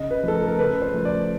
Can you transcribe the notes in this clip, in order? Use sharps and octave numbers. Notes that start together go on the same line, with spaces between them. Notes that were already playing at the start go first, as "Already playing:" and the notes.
Already playing: C#3 D#5
B4
F3 A3 A4
A#4
A#4
C#3 B4
C5
F3 A3
D5